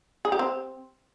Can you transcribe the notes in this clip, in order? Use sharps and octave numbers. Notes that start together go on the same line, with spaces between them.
G#4
G4
C4